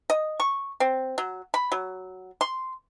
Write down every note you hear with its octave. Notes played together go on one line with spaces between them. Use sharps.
D#5
C#6
C4
F#3
B5
F#3
C6